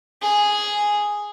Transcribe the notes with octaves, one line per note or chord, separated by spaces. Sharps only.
G#4